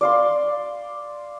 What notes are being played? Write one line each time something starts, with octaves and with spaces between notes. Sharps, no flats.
D5 F5 C6